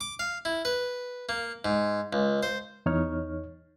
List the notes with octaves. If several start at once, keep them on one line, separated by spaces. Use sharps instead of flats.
D6
F5
E4
B4
A#3
G#2
C#2
C5
E2 D#4 C#5 F6